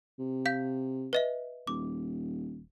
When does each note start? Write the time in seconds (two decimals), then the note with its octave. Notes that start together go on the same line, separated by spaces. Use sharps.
0.19 C3
0.46 F5 G6 B6
1.13 B4 D#5 E5
1.67 D#1 D6